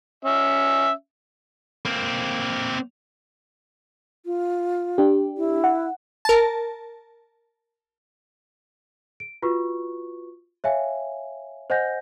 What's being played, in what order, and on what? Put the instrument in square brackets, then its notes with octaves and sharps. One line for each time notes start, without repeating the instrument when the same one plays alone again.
[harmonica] C#4 E5
[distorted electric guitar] A#3 C4
[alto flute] F4
[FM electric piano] D4 G4
[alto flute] E4
[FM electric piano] F#5
[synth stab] A#4 A5
[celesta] D7
F4 F#4 B4 C#6
C#5 E5 F5 G#5
C5 D#5 F#5 G#5 G6 A#6